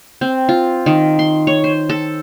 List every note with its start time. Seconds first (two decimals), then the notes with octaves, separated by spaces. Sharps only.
0.21 C4
0.49 F4
0.86 D#3
1.19 C6
1.47 C#5
1.64 C5
1.89 A4